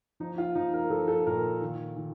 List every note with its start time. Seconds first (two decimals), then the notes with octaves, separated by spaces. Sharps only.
0.20 F3 D#4
0.38 F4
0.55 F3 D#4
0.74 A#4
0.90 F3 A4
1.08 A4
1.26 A#2 A#4
1.61 D#3
1.97 D#3